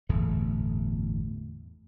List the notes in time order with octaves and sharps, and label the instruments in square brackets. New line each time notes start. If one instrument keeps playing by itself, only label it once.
[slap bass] G1 E2 A2 A3